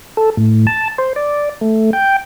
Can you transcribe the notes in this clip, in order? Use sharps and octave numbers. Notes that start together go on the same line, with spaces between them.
A4
A2
A5
C5
D5
A3
G5